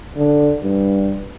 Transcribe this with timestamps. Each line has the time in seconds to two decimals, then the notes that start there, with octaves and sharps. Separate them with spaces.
0.17 D3
0.63 G2